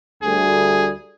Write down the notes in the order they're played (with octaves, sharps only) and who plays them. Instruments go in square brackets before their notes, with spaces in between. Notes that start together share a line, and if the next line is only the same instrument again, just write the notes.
[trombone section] D2 G3 [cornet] G#4